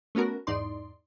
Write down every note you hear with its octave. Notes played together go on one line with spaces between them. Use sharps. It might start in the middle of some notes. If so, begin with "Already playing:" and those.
A3 B3 C#4 F#4 A#4
E2 G#2 D#4 D5 C6